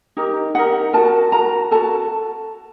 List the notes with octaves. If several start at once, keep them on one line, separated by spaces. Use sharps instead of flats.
D#4 G4 A#4
D#4 G4 A#4 F#5
F#4 A#4 A5
F#4 A#4 A#5
F#4 A4 A5